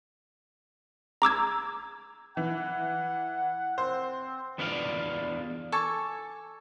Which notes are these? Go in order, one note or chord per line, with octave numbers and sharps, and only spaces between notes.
A#5 D6 E6 G#6
E3 F#5
C4 C5
E2 B3 D4 F4 D5 F5
A4 G#5 C#6 D6